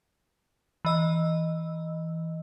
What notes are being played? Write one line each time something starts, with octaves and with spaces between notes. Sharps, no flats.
E3 D#5 E6